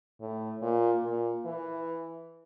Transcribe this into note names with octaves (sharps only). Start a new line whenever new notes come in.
A2
A#2
A#2
E3